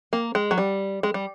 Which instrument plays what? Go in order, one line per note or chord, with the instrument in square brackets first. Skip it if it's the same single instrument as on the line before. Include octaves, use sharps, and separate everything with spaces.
[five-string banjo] A#3
G#3
F#3
G3
G#3
G3